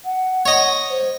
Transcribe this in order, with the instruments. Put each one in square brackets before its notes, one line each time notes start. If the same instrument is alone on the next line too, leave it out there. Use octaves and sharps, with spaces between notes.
[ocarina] F#5
[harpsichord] C#5 D#5
[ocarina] C5